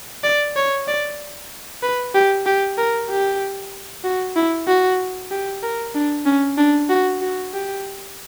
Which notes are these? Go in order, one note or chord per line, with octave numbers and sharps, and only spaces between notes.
D5
C#5
D5
B4
G4
G4
A#4
G4
F#4
E4
F#4
G4
A#4
D4
C#4
D4
F#4
F#4
G4